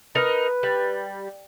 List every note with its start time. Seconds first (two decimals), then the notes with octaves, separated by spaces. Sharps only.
0.15 D#4 A#4 B4
0.63 G3